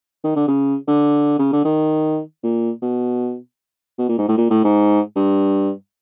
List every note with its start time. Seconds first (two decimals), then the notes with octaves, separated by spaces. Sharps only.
0.24 D#3
0.36 D3
0.48 C#3
0.88 D3
1.39 C#3
1.53 D3
1.65 D#3
2.43 A#2
2.82 B2
3.98 B2
4.09 A#2
4.18 G#2
4.29 A2
4.38 A#2
4.51 A2
4.64 G#2
5.16 G2